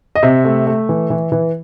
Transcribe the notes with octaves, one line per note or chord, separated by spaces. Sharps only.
D#5
C3 E5
A3
A3
E3
E3
E3